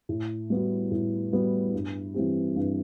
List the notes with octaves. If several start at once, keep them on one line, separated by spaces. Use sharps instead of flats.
A2
G3 B3 F#4
A2
G3 B3 F#4
G2
E3 G3 C4 G4
G2